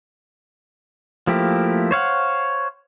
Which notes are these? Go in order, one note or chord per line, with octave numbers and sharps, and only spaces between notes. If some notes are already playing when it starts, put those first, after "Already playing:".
F3 A3 A#3 E4 G4
C5 C#5 F5 F#5